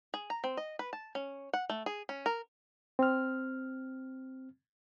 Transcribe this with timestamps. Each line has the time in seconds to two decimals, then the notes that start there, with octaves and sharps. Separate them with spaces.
0.14 G#4
0.30 A#5
0.44 C4
0.57 D#5
0.79 B4
0.93 A5
1.15 C#4
1.53 F#5
1.69 A3
1.86 G#4
2.09 C#4
2.26 A#4
2.99 C4 F6